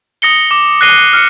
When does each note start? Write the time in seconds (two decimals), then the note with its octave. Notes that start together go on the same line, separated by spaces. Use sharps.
0.22 D#6 A#6 C#7 G7
0.51 D6
0.81 F#6 A#6 C7 D#7 G7
1.13 F6 C#7